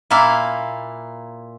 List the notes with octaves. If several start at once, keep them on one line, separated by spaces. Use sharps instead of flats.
A#2 A#3 E4 F5